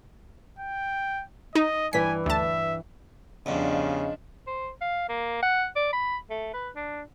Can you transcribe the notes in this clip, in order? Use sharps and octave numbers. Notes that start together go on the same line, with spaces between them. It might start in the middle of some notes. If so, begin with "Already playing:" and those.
G5
D#4 D#5
G2 E3 G#5 B6
D2 E5 A5
E2 G2 C#3 F3 D4 D#5
C5
F5
A#3
F#5
D5
B5
A3
B4
D4